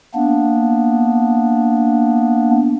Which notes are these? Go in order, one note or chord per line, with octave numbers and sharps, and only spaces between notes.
A#3 B3 D4